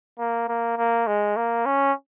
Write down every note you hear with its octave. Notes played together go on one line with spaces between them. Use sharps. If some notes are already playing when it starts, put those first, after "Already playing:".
A#3
A#3
A#3
G#3
A#3
C#4